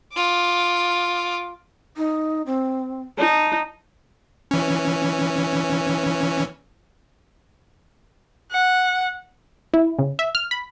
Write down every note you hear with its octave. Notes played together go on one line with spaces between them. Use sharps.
F4 D6
D#4
C4
D#4 A5
E3 C#4
F#5
E4
C#3
E5
F6
B5